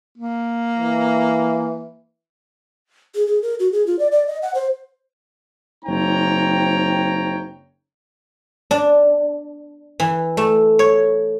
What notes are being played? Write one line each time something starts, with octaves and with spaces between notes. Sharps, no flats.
A#3
E3
G#4
G#4
A#4
F#4
G#4
F4
D5
D5
D#5
F#5
C5
F#1 C4 D#4 C#5 G5 A#5
D4
E3
A3
C#5